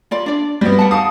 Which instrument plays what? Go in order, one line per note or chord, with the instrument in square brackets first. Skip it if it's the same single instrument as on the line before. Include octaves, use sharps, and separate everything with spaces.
[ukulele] F4 D5 B5
D4 D5
[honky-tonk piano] G3 B3 [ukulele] F#4
[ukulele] F#5 A5
[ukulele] D#4 F5 A5 [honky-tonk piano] D#6